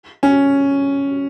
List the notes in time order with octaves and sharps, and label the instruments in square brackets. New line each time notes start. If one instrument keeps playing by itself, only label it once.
[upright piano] C#4